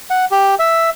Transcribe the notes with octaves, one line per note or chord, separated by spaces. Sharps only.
F#5
G4
E5